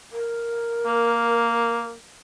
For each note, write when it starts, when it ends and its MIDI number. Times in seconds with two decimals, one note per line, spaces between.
0.12 1.90 70
0.86 1.93 58